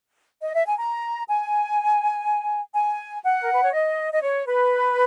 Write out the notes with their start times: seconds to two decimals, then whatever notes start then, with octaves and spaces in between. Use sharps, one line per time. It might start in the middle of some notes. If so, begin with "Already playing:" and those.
0.40 D#5
0.54 E5
0.65 G#5
0.78 A#5
1.28 G#5
2.74 G#5
3.24 F#5
3.41 A#4
3.52 B4
3.63 C#5
3.73 D#5
4.12 D#5
4.22 C#5
4.47 B4